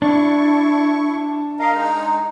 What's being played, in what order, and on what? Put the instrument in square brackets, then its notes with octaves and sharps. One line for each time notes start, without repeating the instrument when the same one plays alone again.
[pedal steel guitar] D4 [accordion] E4 C#6
[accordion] A#4 D#5 F5 [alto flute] A#5
[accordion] G#3 D#4